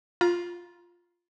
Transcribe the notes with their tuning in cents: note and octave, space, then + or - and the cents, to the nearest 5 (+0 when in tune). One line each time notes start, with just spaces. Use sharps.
F4 +0 A#5 +40